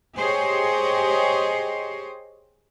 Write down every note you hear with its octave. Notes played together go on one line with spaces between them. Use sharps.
G4 G#4 C5 C#5 D#5